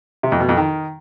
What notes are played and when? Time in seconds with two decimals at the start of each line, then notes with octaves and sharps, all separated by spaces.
0.23 C3
0.32 F2
0.40 B2
0.49 F2
0.57 D#3